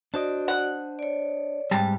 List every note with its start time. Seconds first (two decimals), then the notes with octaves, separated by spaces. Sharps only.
0.14 D4 F#4 C5 D5 D#5
0.48 F#5
0.99 C#5 D5
1.71 G#2 G3 C4 A5